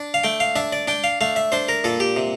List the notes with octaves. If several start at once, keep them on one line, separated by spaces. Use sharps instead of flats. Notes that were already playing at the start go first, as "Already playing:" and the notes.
Already playing: D4
F5
A3 G5
F5
D4 E5
D5
D4 G5
F5
A3 F5
E5
D4 C5
A#4
A#2 A4
G4
C3